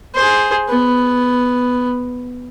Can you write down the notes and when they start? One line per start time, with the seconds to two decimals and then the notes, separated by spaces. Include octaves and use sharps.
0.15 G#4 C5
0.69 B3